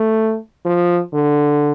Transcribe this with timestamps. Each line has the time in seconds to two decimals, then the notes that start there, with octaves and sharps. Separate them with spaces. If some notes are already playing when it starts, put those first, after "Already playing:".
Already playing: A3
0.66 F3
1.14 D3